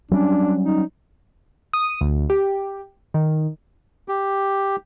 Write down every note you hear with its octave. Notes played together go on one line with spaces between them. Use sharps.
F#3 G3 C#4 D4
D#4
D#6
D2
G4
D#3
G4